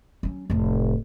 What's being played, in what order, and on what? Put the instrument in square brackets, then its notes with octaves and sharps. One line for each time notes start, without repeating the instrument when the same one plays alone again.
[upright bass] F#3 C#4
F1 A2